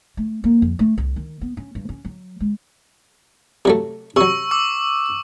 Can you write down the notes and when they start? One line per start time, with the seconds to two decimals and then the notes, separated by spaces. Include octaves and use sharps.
0.17 A3
0.44 A#3
0.62 F2
0.79 A3
0.98 C2
1.16 D#3
1.41 B3
1.57 C#4
1.75 G2
1.89 C#4
2.05 F#3
2.40 G#3
3.65 C3 F#3 A3
4.16 C3 F#3 C#6 E6
4.51 C#6 D6 E6